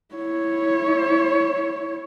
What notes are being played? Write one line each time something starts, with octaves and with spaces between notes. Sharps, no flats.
E4 C#5